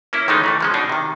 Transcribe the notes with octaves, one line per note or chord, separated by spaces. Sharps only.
A#3 C#4 E4
D#3 E3 G#3 A3 C#4 D#4
D#3 E3 A3
F3 G#3 C#4
B2 D4 D#4
C3 D#3